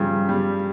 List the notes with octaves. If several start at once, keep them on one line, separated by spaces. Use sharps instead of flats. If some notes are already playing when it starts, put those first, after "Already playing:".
Already playing: G2 C#3 F3
G3